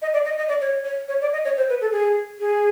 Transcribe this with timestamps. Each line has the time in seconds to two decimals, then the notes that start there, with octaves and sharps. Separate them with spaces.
0.02 D#5
0.13 D5
0.25 D#5
0.38 D#5
0.49 D5
0.61 C#5
0.84 C#5
1.08 C#5
1.21 D5
1.33 D#5
1.45 C#5
1.57 C5
1.69 B4
1.81 A4
1.92 G#4
2.40 G#4